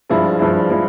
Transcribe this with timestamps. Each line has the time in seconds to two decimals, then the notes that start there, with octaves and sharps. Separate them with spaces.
0.10 G2 F3 G#3 E4
0.39 G2 F3 G#3 E4
0.70 F3 G#3 E4